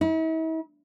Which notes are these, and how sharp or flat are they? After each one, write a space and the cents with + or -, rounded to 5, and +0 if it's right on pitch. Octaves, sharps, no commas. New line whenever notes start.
E4 -45